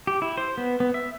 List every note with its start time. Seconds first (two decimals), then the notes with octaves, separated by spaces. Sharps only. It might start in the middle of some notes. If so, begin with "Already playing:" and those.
0.07 G4
0.22 E4
0.37 C5
0.58 B3
0.80 B3
0.94 E5